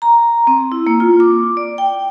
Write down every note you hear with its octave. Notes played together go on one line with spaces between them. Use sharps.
A#5
C4
E4
A#3
F4
D6
D5
G5